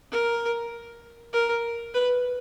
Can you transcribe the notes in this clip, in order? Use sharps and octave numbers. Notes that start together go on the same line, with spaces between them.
A#4
A#4
B4